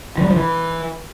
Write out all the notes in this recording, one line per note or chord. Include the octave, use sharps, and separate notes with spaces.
E3
G3
F3
E3